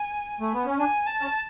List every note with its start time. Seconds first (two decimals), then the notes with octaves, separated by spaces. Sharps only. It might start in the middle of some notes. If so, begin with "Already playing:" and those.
Already playing: G#5
0.40 A3
0.53 B3
0.66 C#4
0.78 D4 G#5
1.06 A5
1.21 C#4